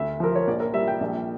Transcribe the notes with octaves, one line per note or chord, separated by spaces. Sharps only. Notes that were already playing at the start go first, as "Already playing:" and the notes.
Already playing: D2 E5
F3 A#4
C#5
A#1 D5
A#4
G3 E5
G5
A#1